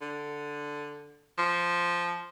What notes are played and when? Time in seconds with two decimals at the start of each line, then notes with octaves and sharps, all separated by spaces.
0.01 D3
1.38 F3